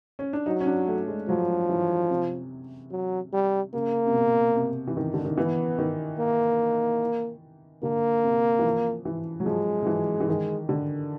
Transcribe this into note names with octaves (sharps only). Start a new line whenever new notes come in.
C#4
D4
F#3 D#4
C#4
D4
A3
G#3
F3 F#3
E3
C3
F#3
G3
C#3 A#3
C3
B2
C3
E3
D#3
D3
D#3
E3 B3
D#3
A#3
D3 A#3
C3
E3
F3
E3
F#3
F3 G#3
F3
E3
E3
D#3
D3